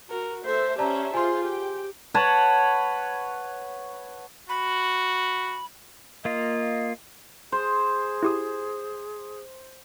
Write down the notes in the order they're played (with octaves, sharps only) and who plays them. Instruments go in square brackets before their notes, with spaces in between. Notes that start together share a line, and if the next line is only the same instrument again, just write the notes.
[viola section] F#4 [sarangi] A#4
[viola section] A3 A4 E5 [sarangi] C5
[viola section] C#4 C5 E5 [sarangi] G4 [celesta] D5 A5 A#5
[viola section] F4 G#4 [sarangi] C5 [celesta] G#5 C6
[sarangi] G4 [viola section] G5
[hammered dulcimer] B4 C#5 F#5 A5
[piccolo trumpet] F#4 [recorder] B5
[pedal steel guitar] A#3 F4 [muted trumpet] D#5
[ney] G#4 [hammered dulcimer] C5
[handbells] E4 G4 D#6